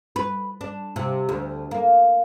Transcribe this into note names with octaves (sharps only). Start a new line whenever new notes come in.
B4
D4
C3
D2
A#3